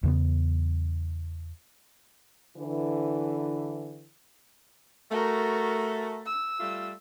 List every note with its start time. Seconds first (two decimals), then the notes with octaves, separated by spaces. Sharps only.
0.03 E2 C#3 B3
2.57 D3 E3
5.11 A3 F#4 A#4
6.26 E6
6.60 G3 A3 F4